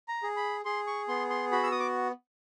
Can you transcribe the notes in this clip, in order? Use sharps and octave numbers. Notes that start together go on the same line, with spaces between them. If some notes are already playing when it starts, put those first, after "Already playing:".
A#5
G#4
B5
G#4 C6
C#6
B3 C6
C6
F#4 B5
E6
D#6
D6